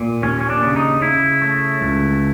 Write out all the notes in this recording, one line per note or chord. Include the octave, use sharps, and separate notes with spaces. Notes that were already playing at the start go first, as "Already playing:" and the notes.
Already playing: A#2
D#2 C#4
C#4
D4
C#3
D#4
C#3 E4
A3
C#2